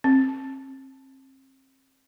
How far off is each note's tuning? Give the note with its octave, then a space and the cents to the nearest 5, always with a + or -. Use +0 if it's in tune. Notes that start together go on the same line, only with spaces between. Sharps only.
C4 +35